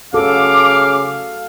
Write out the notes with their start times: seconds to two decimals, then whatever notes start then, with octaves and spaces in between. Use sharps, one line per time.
0.14 C#3 F#4 A4 F5 D6